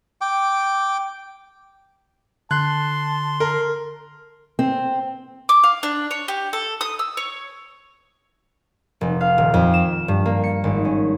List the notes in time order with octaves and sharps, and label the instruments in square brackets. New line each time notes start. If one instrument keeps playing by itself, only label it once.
[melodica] G5 D6
[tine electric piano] D3 [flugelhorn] A5 [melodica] C6 [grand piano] F#6
[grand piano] A#4
[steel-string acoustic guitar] C4
[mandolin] D6
F5
D4
C#5
G4
A4
D#6
E6
C#5
[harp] F1
F5
D#1
F2
E7
G2
A#3
C#7
G#1
C#4